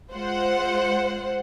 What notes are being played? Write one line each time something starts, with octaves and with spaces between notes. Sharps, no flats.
G#3 F4 C5 F#5